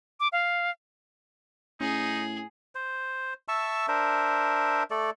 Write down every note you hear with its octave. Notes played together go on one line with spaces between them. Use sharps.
D6
F5
A2 C#4 D#4 G#4
C5
E5 A5 C#6 E6
D4 A#4 C5 E5
A3 A4 D5